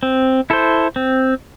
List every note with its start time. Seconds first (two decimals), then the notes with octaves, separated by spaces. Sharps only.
0.03 C4
0.50 E4 A4 C5
0.96 C4